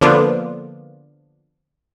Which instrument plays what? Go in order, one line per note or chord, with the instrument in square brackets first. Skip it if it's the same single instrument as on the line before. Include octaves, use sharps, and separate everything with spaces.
[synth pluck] D3 F3 A#3 B3 D4 F4